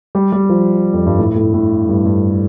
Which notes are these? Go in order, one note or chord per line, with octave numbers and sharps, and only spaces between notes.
G3
G3
F3
F2
G2
A2
A2
A2
G2
G2